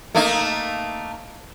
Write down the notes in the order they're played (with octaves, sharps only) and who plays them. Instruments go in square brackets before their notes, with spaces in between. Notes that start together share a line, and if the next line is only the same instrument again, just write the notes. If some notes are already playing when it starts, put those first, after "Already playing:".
[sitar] A3 A#3 D#4